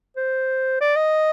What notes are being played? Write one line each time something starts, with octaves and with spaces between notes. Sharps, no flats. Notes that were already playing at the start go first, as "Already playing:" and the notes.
C5
D5
D#5